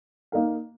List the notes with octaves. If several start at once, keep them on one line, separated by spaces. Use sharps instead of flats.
A#3 D#4 A#4 F5